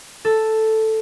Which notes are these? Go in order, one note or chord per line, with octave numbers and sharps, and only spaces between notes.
A4